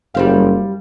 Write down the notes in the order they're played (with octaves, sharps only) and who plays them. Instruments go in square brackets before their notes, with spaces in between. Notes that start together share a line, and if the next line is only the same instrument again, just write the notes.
[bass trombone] F#1 [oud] G3 C5 F5